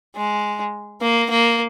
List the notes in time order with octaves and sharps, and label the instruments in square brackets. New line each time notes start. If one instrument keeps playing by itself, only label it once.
[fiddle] G#3
A#3
A#3